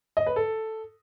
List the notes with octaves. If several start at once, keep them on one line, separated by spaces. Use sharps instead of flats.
D#5
B4
A4